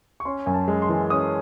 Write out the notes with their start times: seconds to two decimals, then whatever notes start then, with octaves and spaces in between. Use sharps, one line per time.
0.20 C#6
0.25 C#4 C6
0.46 F#2 G#5
0.54 A5
0.68 G#3
0.82 C6
0.89 E3
1.10 C#4 D#6